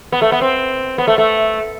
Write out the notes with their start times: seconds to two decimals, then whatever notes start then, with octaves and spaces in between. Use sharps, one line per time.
0.12 B3
0.22 A3
0.32 B3
0.41 C4
0.98 B3
1.07 A3
1.18 A3